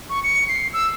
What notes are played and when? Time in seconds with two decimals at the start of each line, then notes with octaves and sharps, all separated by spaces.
0.10 C#6
0.23 C#7
0.49 C7
0.74 E6